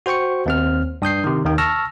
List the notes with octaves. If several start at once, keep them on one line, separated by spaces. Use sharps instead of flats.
F#4 C5 G5 C#6 C#7
D#2 C4 F6
G2 D#6 G6 C7
C3 D#3
D#2 D#3 G5
A5 C#6 E6 F6 A#6